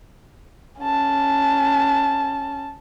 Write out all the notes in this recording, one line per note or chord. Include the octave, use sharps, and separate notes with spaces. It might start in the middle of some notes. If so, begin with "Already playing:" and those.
C#4 A5